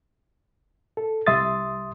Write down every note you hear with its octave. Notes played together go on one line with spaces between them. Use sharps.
A4
C2 G3 E5 C6 D#6 A6